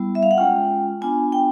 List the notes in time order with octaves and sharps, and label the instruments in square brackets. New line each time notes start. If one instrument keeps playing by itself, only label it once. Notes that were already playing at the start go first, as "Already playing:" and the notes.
Already playing: [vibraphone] G3 B3 E4
E5
F5
F#5
G#3 C#4 F4 G5
B3 D4 F4 G#5
G5